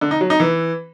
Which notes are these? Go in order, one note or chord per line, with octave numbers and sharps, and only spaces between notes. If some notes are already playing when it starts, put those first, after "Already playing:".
D3
D#4
F#3
D#4
E3